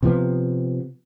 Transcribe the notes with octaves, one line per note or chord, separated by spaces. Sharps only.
C3 F3 B3